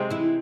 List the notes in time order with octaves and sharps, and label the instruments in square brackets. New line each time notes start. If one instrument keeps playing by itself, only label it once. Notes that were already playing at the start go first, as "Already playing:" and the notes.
Already playing: [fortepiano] C3 G#3 C4
[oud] E3 E4